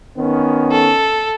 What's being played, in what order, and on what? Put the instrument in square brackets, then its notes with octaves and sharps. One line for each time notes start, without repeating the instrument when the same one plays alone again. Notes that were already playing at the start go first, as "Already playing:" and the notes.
[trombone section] D#3 B3 C#4
[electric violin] A4